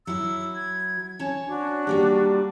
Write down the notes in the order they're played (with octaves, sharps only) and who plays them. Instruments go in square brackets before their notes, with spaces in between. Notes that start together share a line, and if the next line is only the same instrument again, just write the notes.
[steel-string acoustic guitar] F#3 E4 F#4 [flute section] E6
[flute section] G#6
[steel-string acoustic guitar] C#4 C#5 A5
[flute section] D4 F#4
[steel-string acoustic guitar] G3 A#3 G4